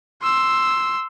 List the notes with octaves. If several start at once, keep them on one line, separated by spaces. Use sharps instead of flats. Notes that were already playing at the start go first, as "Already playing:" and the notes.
C6 E6